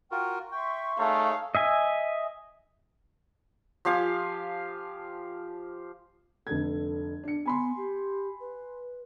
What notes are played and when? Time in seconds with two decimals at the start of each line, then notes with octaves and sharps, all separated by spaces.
0.11 F4 F#4 A#4 G5
0.52 E5 G5 C6 C#6
0.99 A3 D#4 G#4 C#5 F5
1.55 D#5 E5 G#5
3.85 F3 G4 F5 G#5
6.47 F1 D3 A4 G#6
7.24 D4 C#7
7.46 B3 G#5 B5 C6
7.77 G4
8.40 B4